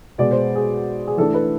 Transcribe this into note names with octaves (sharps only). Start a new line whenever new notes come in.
B2 G#3 B3 D5
C5
G#4
G#4
E3 A3 D4 A4
B4